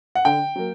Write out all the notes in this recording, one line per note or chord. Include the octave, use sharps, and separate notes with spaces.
F#5
D3 G5
F#3 A#3